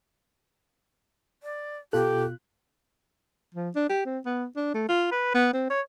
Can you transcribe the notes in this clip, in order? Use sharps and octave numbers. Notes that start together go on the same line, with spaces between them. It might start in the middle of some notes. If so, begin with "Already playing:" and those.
D5
B2 F4 G4 A4 F#6
F3
D4
G4
C4
B3
D4
A3
F4
B4
B3
C4
C#5